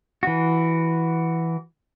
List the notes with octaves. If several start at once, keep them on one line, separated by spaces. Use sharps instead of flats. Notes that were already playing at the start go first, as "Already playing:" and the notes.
E3 F#4